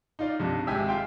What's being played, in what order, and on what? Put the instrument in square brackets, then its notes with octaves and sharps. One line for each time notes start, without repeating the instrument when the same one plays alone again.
[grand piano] D#4 F4 D5
C2 G2
G#1 G#3 G4 E5 G#5 E6
F4 G5 C6